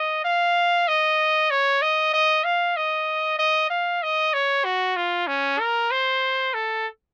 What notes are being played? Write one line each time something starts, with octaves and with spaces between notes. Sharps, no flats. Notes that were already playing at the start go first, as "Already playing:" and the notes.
Already playing: D#5
F5
D#5
C#5
D#5
D#5
F5
D#5
D#5
F5
D#5
C#5
F#4
F4
C#4
A#4
C5
A4